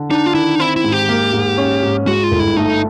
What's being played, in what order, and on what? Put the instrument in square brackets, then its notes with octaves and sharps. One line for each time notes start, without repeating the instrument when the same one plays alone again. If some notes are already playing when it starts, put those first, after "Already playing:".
Already playing: [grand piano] D3
[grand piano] D4 [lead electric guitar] D#4
[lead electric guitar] F4
[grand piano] D#3 [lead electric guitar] E4
[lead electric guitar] D#4
[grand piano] C4 [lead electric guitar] E4
[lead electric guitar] E4
[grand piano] G#2
[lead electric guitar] G4
[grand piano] A#3
G#2
C#4
G#2
[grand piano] G#3 [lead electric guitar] F#4
[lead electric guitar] F4
[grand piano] G1
[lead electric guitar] E4
[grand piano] A3 [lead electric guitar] D#4